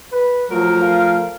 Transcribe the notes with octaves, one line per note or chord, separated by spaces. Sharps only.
B4
F3 F#3 A3 A#4
F5